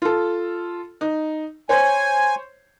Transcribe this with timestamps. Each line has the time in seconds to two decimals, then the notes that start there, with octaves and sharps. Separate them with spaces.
0.02 F4 A4
1.01 D#4
1.69 C5 C#5 G#5